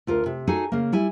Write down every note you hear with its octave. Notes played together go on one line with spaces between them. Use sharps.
D2 F4 A#4
C3
D#4 F#4 G#4 A4 G#5
C#3 A#3
G3 E4 G#5